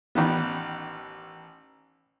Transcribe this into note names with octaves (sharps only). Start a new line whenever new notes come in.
A1 D#3 B3